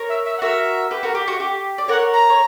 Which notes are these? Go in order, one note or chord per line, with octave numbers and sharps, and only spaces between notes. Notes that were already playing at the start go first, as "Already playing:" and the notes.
Already playing: A#4 C#5
E5
E5
F#5
F#4 A#4 E5
G4 B4
F#4 A#4
G4
F#4
G4
D5
A#4 C#5 F#5
A#5
C#5